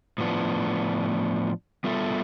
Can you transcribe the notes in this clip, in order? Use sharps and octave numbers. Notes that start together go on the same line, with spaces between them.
A2 F3 B3 D4
G3 B3 F4 A4 E5